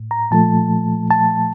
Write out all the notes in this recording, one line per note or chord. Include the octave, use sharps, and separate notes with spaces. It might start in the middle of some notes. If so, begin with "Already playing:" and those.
Already playing: A2
A#5
A#2 F3 A3 A5
A5